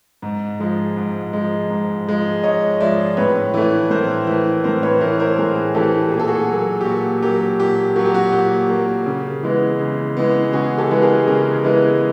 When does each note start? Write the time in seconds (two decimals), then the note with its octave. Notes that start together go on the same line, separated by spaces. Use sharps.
0.22 G#2
0.60 F3 G#3
0.96 G#2
1.33 F3 G#3
1.70 G#2
2.07 F3 G#3
2.43 G#2 C#5 D#5
2.80 F3 G#3 D5 E5
3.17 A2 B4 C#5
3.54 E3 A3
3.91 A2 A#4 C5
4.27 E3 A3
4.64 A2 A#4 C5
4.83 B4 C#5
5.01 E3 A#4 C5
5.06 A3
5.20 A#4 C5
5.38 A2 G#4 A#4
5.74 E3 A3 G4 A4
6.12 A#2 G#4
6.20 A4
6.28 F#4 G#4
6.49 F#3 A#3
6.81 G4
6.85 A#2 F#4
7.22 F#3 A#3 G4
7.59 A#2 G4
7.96 F#3 A#3 F#4
8.05 G4
8.14 F#4
8.32 A#2 G4
8.69 F#3 A#3
9.06 C#3
9.43 E3 G#3 B3
9.79 C#3
10.17 E3 G#3 B3
10.53 C#3 F#4 G#4
10.78 G4 A4
10.91 E3 G#3 B3
11.02 G#4 A#4
11.26 C#3 G#4 A#4
11.64 E3 G#3 B3